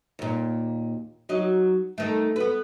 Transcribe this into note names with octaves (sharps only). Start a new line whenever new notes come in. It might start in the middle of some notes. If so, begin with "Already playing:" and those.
D#2 A#2
F#3 D#4
D#3 A3
B3 B4